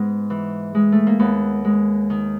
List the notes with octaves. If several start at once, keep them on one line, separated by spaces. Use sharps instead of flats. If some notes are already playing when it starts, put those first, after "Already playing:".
Already playing: G#2 G#3 B3
E3
G#3
A3
A#3
D#2 B3
G#3
D#3